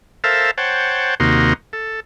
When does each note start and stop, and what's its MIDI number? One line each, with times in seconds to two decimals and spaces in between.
0.24 0.51 69
0.24 0.51 70
0.24 0.51 72
0.24 0.51 76
0.24 0.51 77
0.24 0.51 81
0.58 1.15 72
0.58 1.15 73
0.58 1.15 78
0.58 1.15 79
0.58 1.15 81
1.20 1.53 39
1.20 1.53 48
1.20 1.53 58
1.20 1.53 63
1.20 1.53 66
1.20 1.53 84
1.73 2.00 69